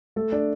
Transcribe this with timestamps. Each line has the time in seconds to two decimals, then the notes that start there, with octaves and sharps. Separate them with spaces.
0.16 A3 A4
0.32 D4 D5